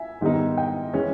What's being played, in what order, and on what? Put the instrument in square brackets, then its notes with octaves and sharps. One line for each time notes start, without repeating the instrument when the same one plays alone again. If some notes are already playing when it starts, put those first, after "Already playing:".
Already playing: [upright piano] E5 G#5
G#2 D#3 G3 B3 D#4
D#5 G5
E3 G#3 C#4